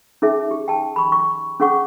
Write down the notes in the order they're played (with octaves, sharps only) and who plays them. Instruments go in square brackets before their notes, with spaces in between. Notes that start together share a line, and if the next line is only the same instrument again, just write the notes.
[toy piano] C#4 D#4 G#4 E5
G4
G5 A5
B5 C#6
C#6
C#4 G#4 F#5 C#6